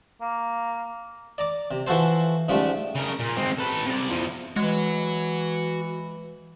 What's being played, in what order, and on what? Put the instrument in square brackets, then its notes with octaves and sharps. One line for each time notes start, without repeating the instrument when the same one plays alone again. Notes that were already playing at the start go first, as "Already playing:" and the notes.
[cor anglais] A#3
[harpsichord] D5 A#5 D6
C3
E3 F3 F#4 A4 C5
G#2 C#3 F3 G3 A3
[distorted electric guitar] C#3 A#4
A#2
G#3 C4
A4 B4
C3 D5
E2 F3
[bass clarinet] E3 [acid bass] G#3 [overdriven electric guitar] F#4 C#5